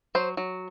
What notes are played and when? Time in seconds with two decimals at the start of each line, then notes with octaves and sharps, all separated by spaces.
0.15 F#3 C5
0.37 F#3